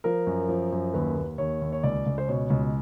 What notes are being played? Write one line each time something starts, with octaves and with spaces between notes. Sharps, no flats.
F3 A#4
F#2
F3
F#2
D#2 B4
D#2
D#2 C#5
D#2
C#5
C#2 D5
C#2
C5
B2 C#5
C#2